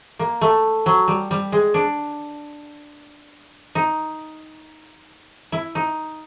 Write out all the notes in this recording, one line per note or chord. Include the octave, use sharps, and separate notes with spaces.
A#3
A3
F#3
G3
G3
G#3
D4
D#4
E4
D#4